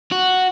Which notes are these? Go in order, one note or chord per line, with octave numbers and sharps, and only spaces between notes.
F#4